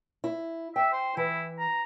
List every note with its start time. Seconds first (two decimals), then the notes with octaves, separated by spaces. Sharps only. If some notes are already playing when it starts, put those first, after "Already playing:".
0.24 E4
0.76 E5 G5
0.93 C5
1.17 E3 E4
1.59 A#5